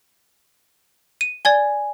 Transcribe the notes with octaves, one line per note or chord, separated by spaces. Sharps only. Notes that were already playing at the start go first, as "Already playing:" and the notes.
D#7
D5 G#5 G#6 G7